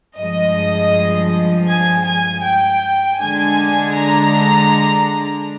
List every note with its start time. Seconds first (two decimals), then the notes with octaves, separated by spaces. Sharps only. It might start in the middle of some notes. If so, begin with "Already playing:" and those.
0.18 G2 F3 G#3 D#5
1.68 G#5
2.06 G#5
2.44 G5
3.19 D3 G#3 D4 G#5
3.94 A#5